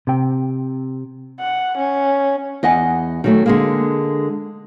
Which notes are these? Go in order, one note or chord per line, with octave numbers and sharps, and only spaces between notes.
C3 G5
F#5
C#4
E2 D#5 F#5 G#5
D#3 F#3 A3
D3 G#3 A#3